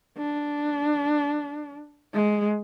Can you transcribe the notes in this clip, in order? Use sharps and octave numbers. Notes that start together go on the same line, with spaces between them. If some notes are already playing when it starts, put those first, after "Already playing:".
D4
G#3